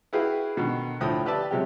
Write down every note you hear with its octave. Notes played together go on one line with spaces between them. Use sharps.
E4 F#4 G#4 B4 F5 G5
B2 D3 D#3
D2 A2 F3 G5 B5 D#6
G4 B4 D5 E5 A5
C3 F#3 G#3 G4